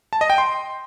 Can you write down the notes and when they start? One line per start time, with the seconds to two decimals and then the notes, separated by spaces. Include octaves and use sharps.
0.13 A5
0.21 D#5
0.30 G5
0.38 C6